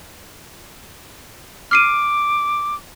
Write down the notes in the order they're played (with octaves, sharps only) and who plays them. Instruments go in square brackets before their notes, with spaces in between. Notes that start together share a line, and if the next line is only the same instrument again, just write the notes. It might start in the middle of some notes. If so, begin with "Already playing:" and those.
[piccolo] D6 [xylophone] F6 C7 D#7